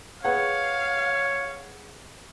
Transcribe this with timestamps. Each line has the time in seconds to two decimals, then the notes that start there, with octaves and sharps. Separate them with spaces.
0.25 G#4 B4 C#5 F5 F#5